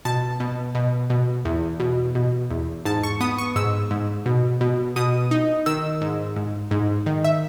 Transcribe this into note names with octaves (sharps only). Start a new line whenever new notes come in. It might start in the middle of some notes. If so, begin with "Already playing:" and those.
B2 A5
B2
B2
B2
E2
B2
B2
E2
G#2 A5
C#6
B3 D#6
C#6
G#2 E6
G#2
B2
B2
B2 D#6
D#4
D#3 E6
G#2
G#2
G#2
D#3
E5